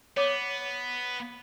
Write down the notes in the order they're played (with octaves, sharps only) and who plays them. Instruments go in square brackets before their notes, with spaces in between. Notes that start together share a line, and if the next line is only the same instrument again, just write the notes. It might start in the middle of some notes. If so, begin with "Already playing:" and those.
[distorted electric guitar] B3 [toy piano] C#5 D6